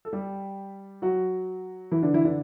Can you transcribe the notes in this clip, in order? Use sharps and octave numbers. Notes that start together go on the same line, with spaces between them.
A4
G3 G4
F#3 F#4
E3 E4
D3 D4
E3 E4
D3 D4